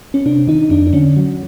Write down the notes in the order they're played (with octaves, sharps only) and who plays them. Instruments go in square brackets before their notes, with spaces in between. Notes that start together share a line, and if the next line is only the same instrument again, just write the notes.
[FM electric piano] C#4
[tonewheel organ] C3 [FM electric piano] D4
[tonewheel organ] D#3 [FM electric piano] D#4
[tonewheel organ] F2 [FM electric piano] D4
[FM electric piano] D4
[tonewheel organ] D3 [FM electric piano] C#4
[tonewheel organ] F#3